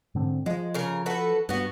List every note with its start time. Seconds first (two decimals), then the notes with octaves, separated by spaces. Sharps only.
0.15 G#2 D3 C4
0.46 F3 G#3
0.74 C#3 A#4
1.06 F#4 A4 B4
1.49 G2 B3 F#4